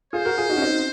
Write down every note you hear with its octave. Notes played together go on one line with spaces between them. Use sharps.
F4 G#4 C5
F#4 A#4
F4 G#4
D#4 F#4
C#4
C4 D#4